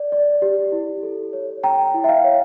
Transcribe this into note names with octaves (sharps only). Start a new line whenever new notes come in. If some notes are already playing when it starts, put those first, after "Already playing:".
Already playing: D5
D5
G4
E4
A4
C#5
C#5 G5 A#5
E4
E5
F5
C#5